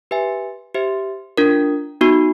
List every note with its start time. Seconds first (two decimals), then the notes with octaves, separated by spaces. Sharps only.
0.11 G4 B4 E5 G#5
0.74 G4 C5 E5
1.37 D4 F4 A#4
2.01 B3 D#4 F#4